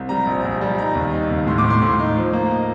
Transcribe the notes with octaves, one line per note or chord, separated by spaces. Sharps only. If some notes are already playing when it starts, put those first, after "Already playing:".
Already playing: C2
G3 A#5
A#1
A#1
G3
D#4 A#5
D#2
D#4
D#2
A2 C6
D6
A2
C6
A2
D#4
F3
A#3
D#5